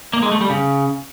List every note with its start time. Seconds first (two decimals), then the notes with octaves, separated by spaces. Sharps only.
0.13 A#3
0.23 G#3
0.32 A3
0.41 G3
0.50 C#3